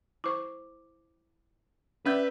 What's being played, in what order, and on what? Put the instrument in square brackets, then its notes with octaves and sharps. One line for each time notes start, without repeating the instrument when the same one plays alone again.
[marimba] E4 C5 C#6 [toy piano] D6
[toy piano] C#4 [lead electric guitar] B4 [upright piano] D5 E5 G6